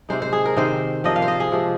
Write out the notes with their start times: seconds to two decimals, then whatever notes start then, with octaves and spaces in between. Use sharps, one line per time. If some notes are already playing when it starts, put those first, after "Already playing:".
0.09 C3 G#3 D#4 C5
0.22 C5
0.33 G#4
0.45 A#4
0.57 C3 D#3 C4 D#4 C5
1.04 C3 F3 A#3 F4 D#5
1.16 F5
1.22 C5
1.28 D#5
1.40 G#4
1.52 C3 F3 G#3